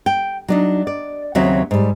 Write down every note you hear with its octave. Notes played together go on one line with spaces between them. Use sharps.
G5
F#3 D4 D#4
D5
D#2 C#3 F#3 C4 F#4 E5
G#2 G3